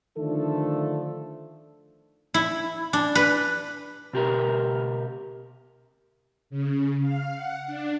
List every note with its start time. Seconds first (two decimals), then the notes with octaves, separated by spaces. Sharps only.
0.18 D3 D#3 F3 A3 D4 A4
2.34 E4
2.93 D4
3.15 B4
4.13 B2 G4 A#4
6.50 C#3
7.02 F5
7.35 F#5
7.66 D4